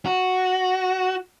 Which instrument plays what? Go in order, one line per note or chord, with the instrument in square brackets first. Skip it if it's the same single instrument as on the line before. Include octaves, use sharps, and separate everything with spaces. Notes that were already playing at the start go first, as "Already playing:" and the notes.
[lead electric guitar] F#4